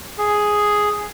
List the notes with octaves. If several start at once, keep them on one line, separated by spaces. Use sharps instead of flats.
G#4